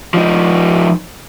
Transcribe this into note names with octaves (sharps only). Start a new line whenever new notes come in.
F3 D#4